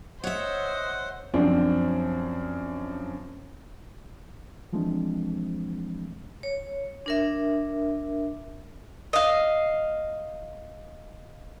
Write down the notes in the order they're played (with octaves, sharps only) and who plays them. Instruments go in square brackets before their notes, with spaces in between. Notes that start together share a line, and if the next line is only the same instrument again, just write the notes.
[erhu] C5 [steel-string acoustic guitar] C#5 E5 [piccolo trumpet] D#5 [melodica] F#5
[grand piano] F#2 F3 C4 D4
[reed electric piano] E3 F3 G#3 A3 C4 D4
[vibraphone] C#5
D4 A#4 E5
[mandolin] D#5 F5